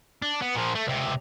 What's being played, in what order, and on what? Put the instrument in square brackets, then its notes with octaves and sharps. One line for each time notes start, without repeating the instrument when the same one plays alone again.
[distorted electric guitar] D4
B3
A#2 F3
A3
C#2 C3